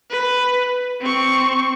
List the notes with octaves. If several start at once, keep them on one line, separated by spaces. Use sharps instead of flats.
B4
C4 C#6